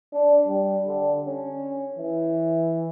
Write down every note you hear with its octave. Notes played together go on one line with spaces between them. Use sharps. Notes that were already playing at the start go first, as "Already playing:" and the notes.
D4
G3
D3
C#4
E3